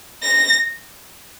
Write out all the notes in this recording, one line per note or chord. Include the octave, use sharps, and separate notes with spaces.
A#6